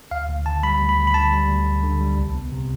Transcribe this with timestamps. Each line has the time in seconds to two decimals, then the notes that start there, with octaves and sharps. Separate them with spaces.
0.11 D2 F5
0.29 D2
0.46 D3 A5
0.63 G3 B5
0.80 D2
0.89 B5
0.97 D2
1.07 B5
1.14 D3 A5
1.32 G3
1.49 D2
1.66 D2
1.84 D3
2.01 G3
2.18 C2
2.35 B3
2.52 C3